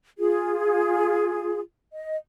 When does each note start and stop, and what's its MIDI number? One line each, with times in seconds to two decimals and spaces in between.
0.18 1.60 65
0.18 1.60 68
1.93 2.16 75